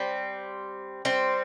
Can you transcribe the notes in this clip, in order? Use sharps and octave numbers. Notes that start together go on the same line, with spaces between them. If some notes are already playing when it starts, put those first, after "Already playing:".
Already playing: G3 C4
G3 C4